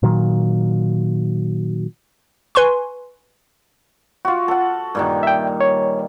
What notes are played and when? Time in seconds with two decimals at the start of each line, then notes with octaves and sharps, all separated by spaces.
0.03 A#2 D#3 F#3
2.55 B4 G#5 C6 C#6
4.25 F4 F#4
4.48 A4 F#5
4.95 G2 A#2 D#3
5.23 E5 G5
5.61 C#5